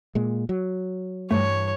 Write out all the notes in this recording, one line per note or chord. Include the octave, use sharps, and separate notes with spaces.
A#2 G#3
F#3
G2 E3 A3 C#5